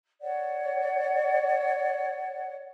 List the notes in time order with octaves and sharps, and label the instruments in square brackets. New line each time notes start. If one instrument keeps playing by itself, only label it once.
[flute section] C#5 D5 F#5